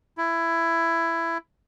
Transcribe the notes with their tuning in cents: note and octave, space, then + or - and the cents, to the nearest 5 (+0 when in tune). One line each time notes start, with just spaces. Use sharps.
E4 +15